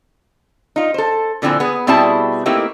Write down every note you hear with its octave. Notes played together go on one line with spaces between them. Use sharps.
D#4 F4
A4 C5
A#2 D3 F3 C4 E4 G#5
B3 G#4
B2 G3 C4 E4 G#4 A5
A3 A#3 C4 D#4 E4 G4